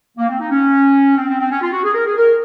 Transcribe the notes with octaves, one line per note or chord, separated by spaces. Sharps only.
A#3
C4
D#4
C#4
C4
C4
C4
C#4
F4
F#4
G#4
A#4
G#4
A#4